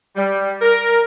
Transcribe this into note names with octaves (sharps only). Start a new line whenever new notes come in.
G3
A#4